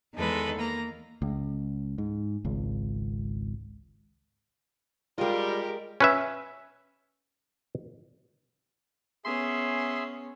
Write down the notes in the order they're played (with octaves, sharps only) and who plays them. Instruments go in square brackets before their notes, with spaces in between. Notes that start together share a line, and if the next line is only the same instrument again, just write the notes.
[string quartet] E2 D#3 G#3 A4 B4
A#3 A#5
[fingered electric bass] C#2
G#2
G#1 C#2
[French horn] G3 [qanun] G#3 D#5 [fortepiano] F4 [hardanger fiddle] G4 A#4
[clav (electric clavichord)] C#4 B4 E5
[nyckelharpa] B3 C#4 [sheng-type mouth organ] G#4 E5 [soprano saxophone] C6